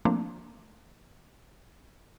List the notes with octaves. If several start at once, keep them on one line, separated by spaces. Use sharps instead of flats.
F3 A3 A#3 C4 D4